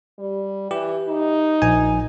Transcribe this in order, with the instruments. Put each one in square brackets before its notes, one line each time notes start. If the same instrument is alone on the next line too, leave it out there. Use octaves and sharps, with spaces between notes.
[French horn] G3
[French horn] E3 [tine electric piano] G4
[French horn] D#4
[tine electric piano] A#1 G#5